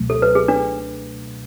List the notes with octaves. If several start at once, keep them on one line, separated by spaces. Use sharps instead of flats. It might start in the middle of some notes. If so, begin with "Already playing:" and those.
Already playing: C#2 B2 F#3 A3
A4
B4
G#4
D4